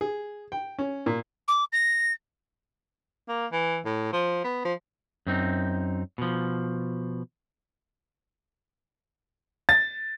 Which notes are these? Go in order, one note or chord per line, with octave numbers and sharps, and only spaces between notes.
G#4
G5
C#4
A#2
D6
A#6
A#3
E3
A2
F3
B3
F3
F#2 C4 D#4
B2 F3
A6